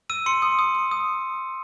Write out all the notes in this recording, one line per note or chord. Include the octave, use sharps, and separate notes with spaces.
E6 D#7
C6 C#7
D#6
D#6
D#6
D#6